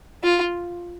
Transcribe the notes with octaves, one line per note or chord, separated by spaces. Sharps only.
F4